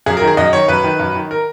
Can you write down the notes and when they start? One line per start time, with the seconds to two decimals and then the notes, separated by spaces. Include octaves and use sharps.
0.06 F#2 G#4
0.17 A#4
0.22 D#3
0.27 G#4
0.37 F#2 D#5
0.53 D#3 C#5
0.68 F#2 B4
0.84 D#3
1.00 F#2
1.15 D#3
1.31 A#4